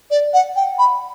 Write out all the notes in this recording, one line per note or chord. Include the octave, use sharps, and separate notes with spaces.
D5
F#5
G5
B5